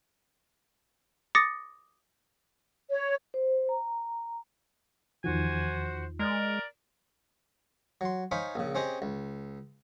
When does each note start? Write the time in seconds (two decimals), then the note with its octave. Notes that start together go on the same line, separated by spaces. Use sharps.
1.35 D6 D#6 A6 A#6 C#7
2.89 C#5
3.34 C5
3.69 A#5
5.24 E2 D#3 F3 F#4 C5 G#5
6.19 G#3 A#4 D5
8.01 F#3 C6
8.31 D#4 C5 C#5 F5 G#5 B5
8.56 A#1 C#3
8.75 C4 C#4 G4 G#4 C5 D#5
9.02 C#2